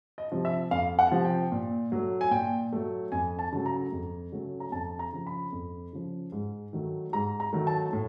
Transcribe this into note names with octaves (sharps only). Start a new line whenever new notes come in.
D#5
C3 F3
E5
F2 F5
F#5
C3 F3
G5
A#2
F#3 A3
G#5
A#2 G5
F#3 A3
F2 G#5
A5
C#3 F#3 A3
A#5
F2
C#3 F#3 A3
A#5
F2 A5
A#5
C#3 F3
B5
F2
C#3 F3
G#2
D#3 F#3 A3
G#2 A#5
A#5
D#3 F#3 A3
A5
A2